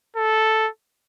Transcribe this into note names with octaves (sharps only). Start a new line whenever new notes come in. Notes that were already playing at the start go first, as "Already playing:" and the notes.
A4